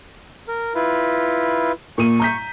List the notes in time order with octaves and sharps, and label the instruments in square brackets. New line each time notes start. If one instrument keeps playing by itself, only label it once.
[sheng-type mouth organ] A#4
E4 F4 B4
[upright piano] A#2 D#7 [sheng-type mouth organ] C#6
[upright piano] A#5 G6 B6